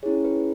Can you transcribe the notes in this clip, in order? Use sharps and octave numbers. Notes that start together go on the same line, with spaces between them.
C#4 E4 G#4 C#5
B4